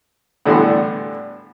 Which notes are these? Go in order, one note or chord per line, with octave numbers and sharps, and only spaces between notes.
A2 D3 E3 G3 B3 C6